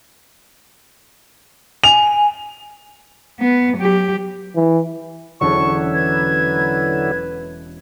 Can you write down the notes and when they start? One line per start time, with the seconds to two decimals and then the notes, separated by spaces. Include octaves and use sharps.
1.84 G#5 F7
3.40 B3
3.77 F#3 G4
4.56 E3
5.41 E1 D3 F#3 C#4 E4 A5 C#6
5.94 B4 G#6